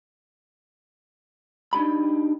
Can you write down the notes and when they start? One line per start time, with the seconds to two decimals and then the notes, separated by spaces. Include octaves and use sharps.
1.73 D4 D#4 G4 B5